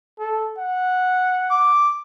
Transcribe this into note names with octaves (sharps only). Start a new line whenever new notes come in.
A4
F#5
D6